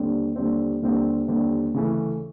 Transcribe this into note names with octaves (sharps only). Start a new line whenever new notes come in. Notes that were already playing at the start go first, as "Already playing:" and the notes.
Already playing: D#2 D3 G3 C4
D#2 D3 G3 C4
D#2 D3 G3 C4
D#2 D3 G3 C4
D2 C#3 E3 A3 C#4